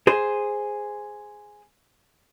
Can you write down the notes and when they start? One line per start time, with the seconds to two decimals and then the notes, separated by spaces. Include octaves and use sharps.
0.07 G#4 C5